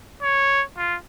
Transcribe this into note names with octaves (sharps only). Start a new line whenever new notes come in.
C#5
F4